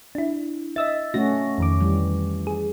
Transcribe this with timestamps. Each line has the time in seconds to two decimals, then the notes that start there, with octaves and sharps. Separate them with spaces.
0.15 D4 E4
0.76 D#5 E5 E6 A6
1.14 A3 C#4 F#4 A#6
1.58 F2 D#3 D6
1.81 E3 G3
2.47 G#4